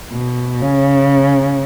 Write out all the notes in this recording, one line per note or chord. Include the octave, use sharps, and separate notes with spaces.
B2
C#3